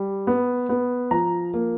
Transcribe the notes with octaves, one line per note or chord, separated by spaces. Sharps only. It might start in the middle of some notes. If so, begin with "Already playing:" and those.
Already playing: G3
B3
B3
F3 A#5
A#3